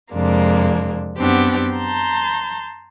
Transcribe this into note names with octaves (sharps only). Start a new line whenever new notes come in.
F2 C3 G#3 A#3 D4
F#2 B3 C4 D4 G4 F#5
A5 A#5 C6 G6